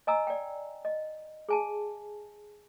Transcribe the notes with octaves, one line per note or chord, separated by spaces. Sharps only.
D#5 G#5 A#5 E6
D5 G5
D#5
G#4 G#5 A5